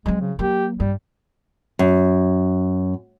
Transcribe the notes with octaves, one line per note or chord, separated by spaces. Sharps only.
F#3 G#3 C4
C#3
F#3 A#3 G4
G2 G3
F#2